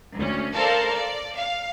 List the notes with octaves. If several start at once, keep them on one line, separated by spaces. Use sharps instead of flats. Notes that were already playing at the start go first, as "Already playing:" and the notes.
D2 C#4
A4 A#4 C5 D5 F5 A5
D5
F5